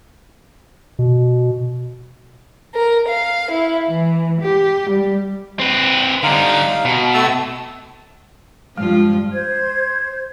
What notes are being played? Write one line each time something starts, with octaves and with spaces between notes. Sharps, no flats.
B2
A#4
F5
E4
E3
G4
G3
C4 B4
D3 G3 D#4 F5
B2
A3 A5 E6
G2 F3 G#3 F4
C5 G#6